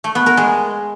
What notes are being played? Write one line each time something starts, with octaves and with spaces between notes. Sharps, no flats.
A3
B3
A#4
G#3